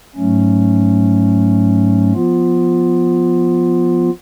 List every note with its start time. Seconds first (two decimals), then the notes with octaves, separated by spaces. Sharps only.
0.16 G#2 F#3 A3 C#4
2.13 F3 B3 F4